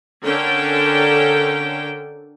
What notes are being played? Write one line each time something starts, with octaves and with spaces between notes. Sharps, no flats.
D3 C#4 D4 A4 A#4 G5